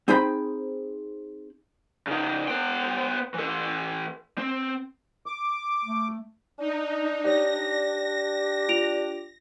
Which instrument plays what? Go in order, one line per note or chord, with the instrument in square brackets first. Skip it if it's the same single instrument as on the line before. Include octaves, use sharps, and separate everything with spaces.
[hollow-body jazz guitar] C4 D#4 G#4 C5 G5 B5
[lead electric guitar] C#3 D#4
B3 G5
E3 A4
C4
[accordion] D6
[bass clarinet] A3
[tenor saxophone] D4 [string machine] D#4
[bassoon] G4 [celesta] C#5 D5 [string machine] A#6
[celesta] F4 D7 F7